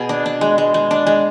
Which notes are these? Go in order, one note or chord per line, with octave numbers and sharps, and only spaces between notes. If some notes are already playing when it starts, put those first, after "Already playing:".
Already playing: B2 B3 G#4
D4
D4
G#3
G#3
G#3
D4
G#3